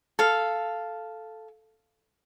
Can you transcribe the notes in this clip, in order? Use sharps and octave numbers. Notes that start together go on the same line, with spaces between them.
A4 F5